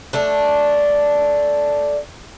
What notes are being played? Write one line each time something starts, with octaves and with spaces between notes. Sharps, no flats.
A3 D4